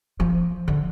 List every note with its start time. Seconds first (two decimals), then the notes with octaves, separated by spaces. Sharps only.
0.20 F3
0.68 D3